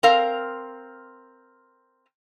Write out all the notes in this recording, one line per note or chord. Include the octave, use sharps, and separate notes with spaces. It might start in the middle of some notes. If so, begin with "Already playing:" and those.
C4 A#4 F5